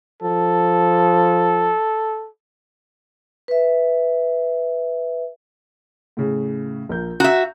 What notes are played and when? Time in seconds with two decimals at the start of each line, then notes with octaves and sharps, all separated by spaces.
0.22 F3 A4
3.48 B4 E5
6.17 A2 C#3
6.89 A#1 A#4 G6
7.20 F#4 E5 A#5